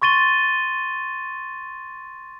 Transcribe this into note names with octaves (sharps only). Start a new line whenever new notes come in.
C6 C#6 A6 D#7 G7